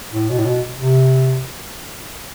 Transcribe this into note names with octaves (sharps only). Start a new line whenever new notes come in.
A2
B2
A2
B2
C3